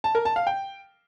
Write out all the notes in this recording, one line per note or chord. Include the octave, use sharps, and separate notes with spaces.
A5
A#4
A5
F5
G5